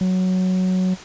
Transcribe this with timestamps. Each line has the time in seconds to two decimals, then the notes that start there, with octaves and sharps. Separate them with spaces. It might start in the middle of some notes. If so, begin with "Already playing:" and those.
0.01 F#3